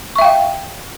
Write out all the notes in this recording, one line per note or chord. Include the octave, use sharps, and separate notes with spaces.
E5 F5 G5 C#6